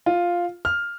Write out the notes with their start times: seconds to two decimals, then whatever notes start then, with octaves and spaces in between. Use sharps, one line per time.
0.06 F4
0.65 F6